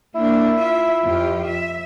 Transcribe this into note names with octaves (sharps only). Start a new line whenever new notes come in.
A#3 D4 E4
F4 E5
F2 F4 G4
E5